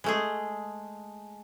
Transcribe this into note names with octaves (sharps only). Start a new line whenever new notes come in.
G#3 A3 G#4